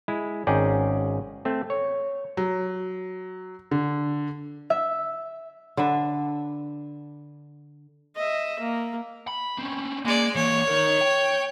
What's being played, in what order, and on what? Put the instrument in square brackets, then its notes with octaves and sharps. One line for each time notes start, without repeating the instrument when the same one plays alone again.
[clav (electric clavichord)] G#3 E4
G#1 C#4 D#4 G#4 D5 G5
A3 C4
C#5
[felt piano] F#3
D3
[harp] E5
[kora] D3 D4 B4 E5
[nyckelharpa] D#5 E5
A#3
[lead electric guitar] B5
C4 C#4
[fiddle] G#3 D5 [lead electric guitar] A#3
[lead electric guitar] E3 A#3 [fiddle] C#5
[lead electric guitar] D#4 A#4
G5